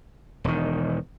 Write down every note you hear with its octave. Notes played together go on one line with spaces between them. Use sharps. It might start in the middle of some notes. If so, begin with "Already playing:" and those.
E1 D#3